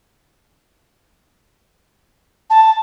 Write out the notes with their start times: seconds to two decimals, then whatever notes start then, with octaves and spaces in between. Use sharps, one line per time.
2.50 A5